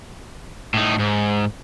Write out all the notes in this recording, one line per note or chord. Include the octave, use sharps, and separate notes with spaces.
A2 D#4
G#2